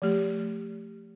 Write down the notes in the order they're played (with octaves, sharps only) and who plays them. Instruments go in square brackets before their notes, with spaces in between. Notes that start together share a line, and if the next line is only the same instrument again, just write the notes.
[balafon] F3 A3 G4